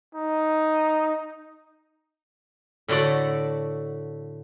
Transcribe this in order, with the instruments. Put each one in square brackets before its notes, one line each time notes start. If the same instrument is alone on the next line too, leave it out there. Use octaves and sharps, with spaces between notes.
[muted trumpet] D#4
[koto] A2 D3 A3 F#4 D5 F#5